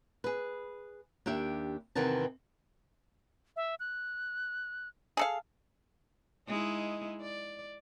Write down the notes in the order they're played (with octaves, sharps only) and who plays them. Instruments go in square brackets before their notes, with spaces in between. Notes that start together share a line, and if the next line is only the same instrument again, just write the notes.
[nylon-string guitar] G#4 B4
D#2 D4 G4 E5
E2 C3 D#3 E3 B3 A5
[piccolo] E5
F#6
[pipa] G#4 A4 F5
[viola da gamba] G#3 D#4 E4
D5